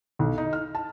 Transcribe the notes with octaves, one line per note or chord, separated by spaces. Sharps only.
B1
D#4
F6
A5